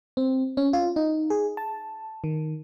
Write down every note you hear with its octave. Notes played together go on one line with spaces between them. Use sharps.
C4
C#4
F4
D#4
G#4
A5
D#3